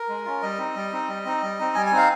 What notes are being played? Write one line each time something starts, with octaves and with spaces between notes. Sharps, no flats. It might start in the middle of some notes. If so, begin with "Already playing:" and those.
Already playing: A#4
G#3
C#4 F4
G3 D#5
C4 D#4
G3
C4 D#4
G3
C4 D#4
G3
C4 D#4
G3 G#5
G#5
C4 D#4
F5